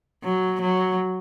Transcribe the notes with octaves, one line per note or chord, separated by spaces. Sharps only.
F#3
F#3